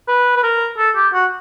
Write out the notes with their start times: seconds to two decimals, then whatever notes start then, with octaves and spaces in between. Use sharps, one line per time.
0.08 B4
0.36 B4
0.43 A#4
0.78 A4
0.95 G4
1.13 F#4